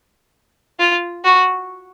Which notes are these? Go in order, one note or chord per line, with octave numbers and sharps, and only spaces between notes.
F4
F#4